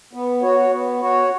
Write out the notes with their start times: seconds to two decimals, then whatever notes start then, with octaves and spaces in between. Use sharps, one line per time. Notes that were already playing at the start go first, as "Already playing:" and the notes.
0.13 B3
0.42 F#4 C#5
0.71 B3
1.00 F#4 C#5